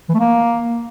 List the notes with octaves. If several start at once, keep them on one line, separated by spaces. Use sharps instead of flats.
E3
A3
A#3